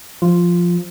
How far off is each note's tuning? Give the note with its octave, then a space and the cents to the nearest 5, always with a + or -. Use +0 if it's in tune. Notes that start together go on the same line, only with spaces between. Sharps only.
F3 +0 F4 +0